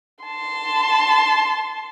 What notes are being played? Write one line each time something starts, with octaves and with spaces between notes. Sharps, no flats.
A5 C6